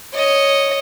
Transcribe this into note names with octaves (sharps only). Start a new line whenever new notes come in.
C#5 D#5